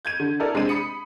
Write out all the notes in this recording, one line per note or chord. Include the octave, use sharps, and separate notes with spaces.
G6 G#6 D#7
D3
E4 A4 A#4 D5
C3 G#3 C4 D4 D#7
B5 D#6 C#7